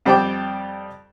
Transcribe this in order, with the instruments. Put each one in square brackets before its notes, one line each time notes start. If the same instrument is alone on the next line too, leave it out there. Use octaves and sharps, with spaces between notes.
[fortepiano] F2 G3 C5 G5 A5 D6